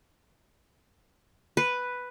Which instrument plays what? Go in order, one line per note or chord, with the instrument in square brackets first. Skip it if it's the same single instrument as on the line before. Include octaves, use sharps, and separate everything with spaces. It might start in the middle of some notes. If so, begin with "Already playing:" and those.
[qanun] B4